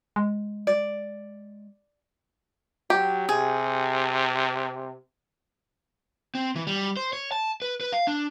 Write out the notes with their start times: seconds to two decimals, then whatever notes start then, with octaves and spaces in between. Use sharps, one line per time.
0.16 G#3
0.67 D5
2.90 F#3 G4
3.29 C3 G#4
6.35 C4
6.56 E3
6.67 G3
6.97 C5
7.13 C#5
7.32 A5
7.62 B4
7.81 B4
7.92 F5
8.07 D4